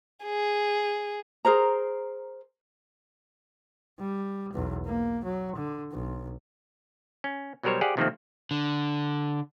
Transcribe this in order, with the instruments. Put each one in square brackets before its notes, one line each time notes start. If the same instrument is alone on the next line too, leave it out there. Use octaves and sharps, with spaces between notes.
[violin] G#4
[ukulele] G#4 A#4 C5 A#5
[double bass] G3
B1 E2
A#3
F#3
D3
B1
[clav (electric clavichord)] C#4
B2 F#3 G3 A#4 C5 C#5
G4 G#4 C5 D5 F5 F#5
C3 D#3 F3 A3 A#3 C4
[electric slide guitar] D3